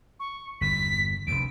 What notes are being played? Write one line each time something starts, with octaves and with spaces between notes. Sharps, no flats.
C#6
G1 E2 B6
F1 D2 D7